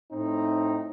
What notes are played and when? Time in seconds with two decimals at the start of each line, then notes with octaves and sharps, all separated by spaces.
0.11 A2 C4 D#4